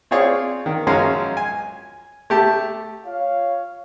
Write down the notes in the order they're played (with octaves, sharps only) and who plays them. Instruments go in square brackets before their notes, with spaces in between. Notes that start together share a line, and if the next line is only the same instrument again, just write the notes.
[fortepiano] C4 F4 G#4 C#5 D5
D#3
F#2 F3 G#3 C#4 F5 A#5
G#5
A3 G4 A5
[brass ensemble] F4 C#5 F5